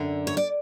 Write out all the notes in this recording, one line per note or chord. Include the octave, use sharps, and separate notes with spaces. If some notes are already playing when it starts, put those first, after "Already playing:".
Already playing: F#2 D3
C#5
D5